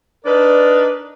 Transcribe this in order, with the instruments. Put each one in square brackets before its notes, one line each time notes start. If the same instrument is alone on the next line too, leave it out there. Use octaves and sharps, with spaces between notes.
[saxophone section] D4 D#4 A#4 B4 D5